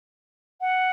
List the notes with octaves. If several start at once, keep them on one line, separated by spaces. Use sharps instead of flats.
F#5